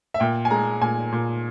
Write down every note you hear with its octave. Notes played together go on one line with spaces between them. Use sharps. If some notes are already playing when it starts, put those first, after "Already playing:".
E5
A#2 G5
G#5
G#3 A#5
A#2 G#5
A#2